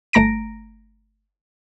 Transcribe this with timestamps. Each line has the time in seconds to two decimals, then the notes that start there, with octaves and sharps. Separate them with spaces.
0.13 G1 A3 A#5 A#6 D7